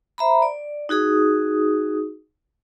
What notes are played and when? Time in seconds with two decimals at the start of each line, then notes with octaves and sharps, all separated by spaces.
0.18 C5 E5 A#5 B5
0.42 D5
0.89 D#4 F#4 G#4 D#6